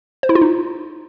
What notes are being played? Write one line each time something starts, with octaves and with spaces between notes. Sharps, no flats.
C5
E4
F4
D#4